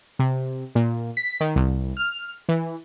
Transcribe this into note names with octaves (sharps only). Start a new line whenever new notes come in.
C3
A#2
B6
D#3
C2
F6
E3